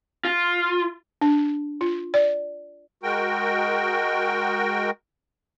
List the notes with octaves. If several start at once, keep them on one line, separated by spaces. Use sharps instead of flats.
F4
D4
F4
D5
G#3 F#4 A#4 G5